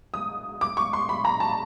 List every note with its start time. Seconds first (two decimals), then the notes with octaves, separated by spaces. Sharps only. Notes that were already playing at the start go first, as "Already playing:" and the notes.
0.14 D#6
0.61 D6
0.77 C#6
0.93 C6
1.09 B5
1.25 A#5
1.40 A5